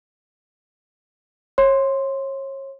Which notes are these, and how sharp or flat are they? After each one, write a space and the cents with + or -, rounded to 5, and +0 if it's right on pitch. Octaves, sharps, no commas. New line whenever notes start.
C#5 -30 C6 +0